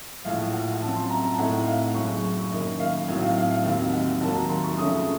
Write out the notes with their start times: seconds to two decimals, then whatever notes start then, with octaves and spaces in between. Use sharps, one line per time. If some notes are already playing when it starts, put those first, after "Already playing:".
0.25 A#1 A2 F3 F5
0.53 F#5
0.73 F#5
0.82 F#2 F3 C4 A5
0.96 C6
1.10 A#5
1.24 A5
1.38 A2 A3 C4 D#4 F#5
1.67 F5
1.94 F#1 F#2 C#3 C#6
2.23 C#6
2.51 F#2 D#3 A#3 D#5
2.80 F5
3.08 A2 F#3 C4 D#4 D#5
3.22 F5
3.36 F5
3.51 F5
3.64 D#2 D#3 F#3 C4 D#4 F5
3.92 F#5
4.21 D#2 D#3 F#3 A#3 A5
4.36 A#5
4.49 C6
4.64 C#6
4.77 F2 C#3 A3 C#4 D#6